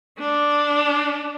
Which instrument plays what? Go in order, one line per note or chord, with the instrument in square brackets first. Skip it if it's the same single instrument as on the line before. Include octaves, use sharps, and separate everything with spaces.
[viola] D4